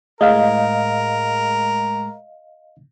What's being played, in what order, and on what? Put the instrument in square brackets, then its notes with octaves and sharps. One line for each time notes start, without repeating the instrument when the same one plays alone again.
[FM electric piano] A2 G#3 [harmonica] A#4 [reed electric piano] D#5 F5